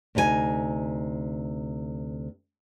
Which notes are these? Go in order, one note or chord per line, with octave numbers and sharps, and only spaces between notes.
D2 C3 D#4 E4 G#5